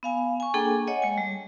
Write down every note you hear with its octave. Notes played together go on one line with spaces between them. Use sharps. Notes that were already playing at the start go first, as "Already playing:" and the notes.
B3 F5 G#5
G#5 C#6
A#3 D4 G#4 A4 G5 G#5
C#5 D#5 F#5 G#5
G#3 G#5
G3